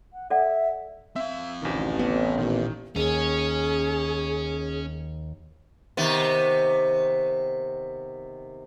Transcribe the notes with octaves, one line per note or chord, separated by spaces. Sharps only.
F#5
A4 D5 E5 F#5
C4 E5 F5
A1 D2 C3 D#3
B3
A#2 D#3
D#2 C#4 G#4 C#5
C3 D#3 B3